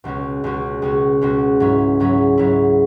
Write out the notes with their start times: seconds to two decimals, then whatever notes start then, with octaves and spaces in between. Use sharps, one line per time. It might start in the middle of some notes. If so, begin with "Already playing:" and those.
0.04 C#2 B2 G#3 C#4 F#4
0.44 C#2 B2 G#3 C#4 F#4
0.82 C#2 B2 G#3 C#4 F#4
1.21 C#2 B2 G#3 C#4 F#4
1.60 G#2 F#3 C#4 E4
2.00 G#2 F#3 C#4 E4
2.37 G#2 F#3 C#4 E4